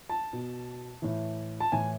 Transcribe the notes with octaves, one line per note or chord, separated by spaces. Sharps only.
A5
B2
A2 E3
A5
A2 E3 G#5